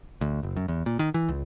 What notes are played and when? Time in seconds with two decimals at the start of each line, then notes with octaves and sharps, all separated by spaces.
0.21 D2
0.43 F#1
0.56 F#2
0.68 E2
0.86 A#2
0.99 D#3
1.14 E3
1.28 C#2